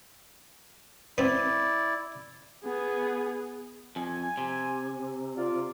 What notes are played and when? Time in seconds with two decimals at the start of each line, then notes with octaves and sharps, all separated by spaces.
1.18 B3 C4 E4 D5
2.64 B3 G#4
3.96 F2 G#5
4.38 C3
5.35 F4 D5